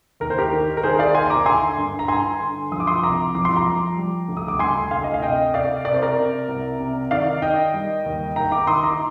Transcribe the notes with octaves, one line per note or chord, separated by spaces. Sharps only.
D#2 A#4
C5
G4 A#4
D#3
A#4
D#3 G#4 C5
D5 F5
D#2 G#5 C6
A#5 D6
D3 G#5 C6
G2
A#5
G2 G#5 C6
D3
F3 D#6
D6
C6 D#6
C2 A#5 D6
F3 D6
C6
A#5 D6
F3
G3
D2
D#6
D6
D2 G#5 C6
D2 F5 G#5
D#5
F5
C3 D#5 G5
C3 D5 F5
C3 D5
C5
A#4 D5
C3
C2
C3
D#3 D5 F5
D#3 D#5 G5
G3
D#2
D#2 G5 A#5
A#5 D6
D#3 C6 D#6
A#5 D6